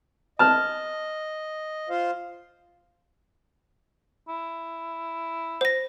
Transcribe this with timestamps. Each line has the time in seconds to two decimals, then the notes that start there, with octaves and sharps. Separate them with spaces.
0.39 D#5 A5 F6
1.89 F4 C5 F5
4.29 E4
5.61 C5 A#6